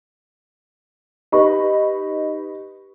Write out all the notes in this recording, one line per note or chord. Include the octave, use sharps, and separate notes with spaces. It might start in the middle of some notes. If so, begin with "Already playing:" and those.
D#4 G4 B4 C#6